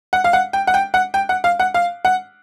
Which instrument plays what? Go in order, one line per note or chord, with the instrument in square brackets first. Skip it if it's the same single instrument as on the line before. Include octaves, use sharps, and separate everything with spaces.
[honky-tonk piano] F#5
F5
F#5
G5
F#5
G5
F#5
G5
F#5
F5
F#5
F5
F#5